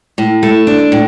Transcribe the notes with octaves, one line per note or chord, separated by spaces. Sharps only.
A2
A3
D4
A2